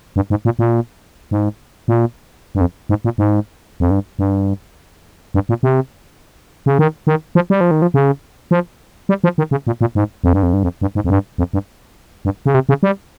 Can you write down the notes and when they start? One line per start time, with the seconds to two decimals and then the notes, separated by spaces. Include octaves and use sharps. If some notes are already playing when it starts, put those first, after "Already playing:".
0.16 G2
0.30 G#2
0.45 A#2
0.59 A#2
1.31 G#2
1.88 A#2
2.55 G2
2.61 F2
2.89 G#2
3.04 A#2
3.18 G#2
3.80 F2
3.91 G2
4.19 G2
5.34 G2
5.49 A#2
5.63 C3
6.66 C#3
6.79 D#3
7.07 D#3
7.35 F3
7.50 G3
7.61 F3
7.71 D#3
7.82 F3
7.94 C#3
8.51 F3
9.09 G3
9.24 F3
9.38 D#3
9.51 C#3
9.67 A#2
9.81 A#2
9.95 G#2
10.24 F2
10.33 G2
10.43 F2
10.53 G2
10.63 F2
10.81 G2
10.95 G#2
11.04 F2
11.10 G2
11.38 F2
11.53 G2
12.25 G2
12.46 C#3
12.54 C3
12.69 C#3
12.83 G3